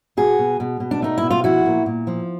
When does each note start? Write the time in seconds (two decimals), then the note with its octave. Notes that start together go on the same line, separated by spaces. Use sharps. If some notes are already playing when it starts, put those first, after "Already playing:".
0.17 B2 F#4 G#4
0.39 B2
0.60 B2
0.80 B2
0.91 D4
1.02 A3 D#4
1.18 B2 E4
1.31 F4
1.44 F3 E4 F#4
1.66 A#2
1.86 A#2
2.07 F3